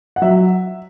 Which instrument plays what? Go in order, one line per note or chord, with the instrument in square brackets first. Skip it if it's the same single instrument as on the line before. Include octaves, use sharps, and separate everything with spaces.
[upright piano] F#5
F#3 E5